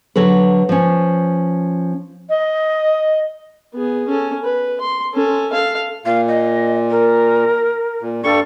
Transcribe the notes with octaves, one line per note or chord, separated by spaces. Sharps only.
D3 F#3 A4 B4
F3 C#4
D#5
B3 G#4
C#4 A4
B4
C6
C#4 A4
A4 F5
A#2 F5
D#5
A#4
A#2
G2 G3 A4 C#6